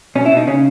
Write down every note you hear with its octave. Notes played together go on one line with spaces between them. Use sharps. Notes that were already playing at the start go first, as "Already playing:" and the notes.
B2 C#4
E4
B2
D#4
C#3 C#4